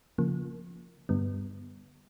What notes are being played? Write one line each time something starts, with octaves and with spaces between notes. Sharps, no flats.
C#3 F3 A#3
G2 D3 G3 B3